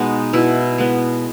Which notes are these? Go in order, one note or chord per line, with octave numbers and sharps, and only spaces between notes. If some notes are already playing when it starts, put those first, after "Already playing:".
Already playing: B2 G#3 B3 D#4
B2 E4
G#3 B3